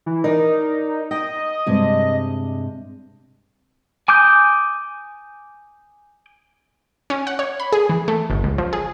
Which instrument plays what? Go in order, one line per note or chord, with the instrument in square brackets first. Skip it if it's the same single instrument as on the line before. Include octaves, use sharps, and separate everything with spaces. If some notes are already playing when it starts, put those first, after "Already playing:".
[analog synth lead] E3
[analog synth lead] D#4 [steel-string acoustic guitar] A#4 D5
[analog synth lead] D#5 [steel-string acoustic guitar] G5
[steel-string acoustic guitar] G2 C3 G#3
[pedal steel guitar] G#5 D6 D#6 G6
[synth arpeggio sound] C#4
F#5
C#5
B5
G#4
E3
A3
G1
C#2
F3
G#4